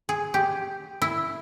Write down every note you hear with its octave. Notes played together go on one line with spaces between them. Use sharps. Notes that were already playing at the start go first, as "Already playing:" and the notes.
G#4
G4
E4